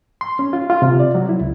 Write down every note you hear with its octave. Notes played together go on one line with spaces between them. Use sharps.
C6
C#4
F4
F4
C3
D5
F#3
E4
C#2